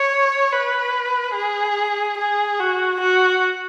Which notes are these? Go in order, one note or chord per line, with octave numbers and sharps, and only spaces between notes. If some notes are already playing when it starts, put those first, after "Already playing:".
Already playing: C#5
B4
G#4
G#4
F#4
F#4